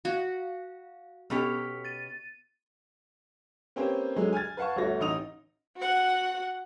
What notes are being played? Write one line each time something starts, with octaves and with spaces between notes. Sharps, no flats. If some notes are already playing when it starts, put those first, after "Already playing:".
F#4 F5
B2 B3 C#4 G4 A4
A6 D#7
A#3 C4 C#4 G4 B4 C5
D3 F#3 G#3
G#5 F6 G#6 A6
B4 F5 F#5 A5 C#6
G1 D2 A3 F#4 C#5 A#6
A1 D#4 D#6 F7
F#4 F#5